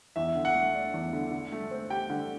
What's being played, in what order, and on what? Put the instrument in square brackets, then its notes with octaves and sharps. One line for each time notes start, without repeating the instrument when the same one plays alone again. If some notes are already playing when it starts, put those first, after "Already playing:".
[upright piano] E2 [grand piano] E5
[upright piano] D3
[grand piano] F#5
[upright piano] A3
D4
E2
D3
D3
A3
C4
[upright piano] G4 [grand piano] G5
[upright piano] D3